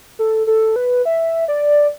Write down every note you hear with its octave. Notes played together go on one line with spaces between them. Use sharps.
A4
A4
B4
E5
D5